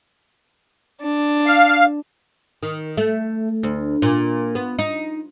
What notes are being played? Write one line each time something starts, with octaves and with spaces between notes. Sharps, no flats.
D4
F5
D#3
A3
D2
A#2
B3
D#4